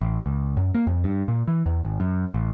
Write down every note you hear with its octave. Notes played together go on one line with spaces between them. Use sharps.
A1
C#2
F#2
A#3
F2
G2
A#2
E3
E2
G#1
F#2
A1